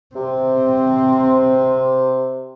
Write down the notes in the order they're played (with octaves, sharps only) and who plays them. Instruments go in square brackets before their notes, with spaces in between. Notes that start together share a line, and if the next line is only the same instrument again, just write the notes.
[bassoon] C3 [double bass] C4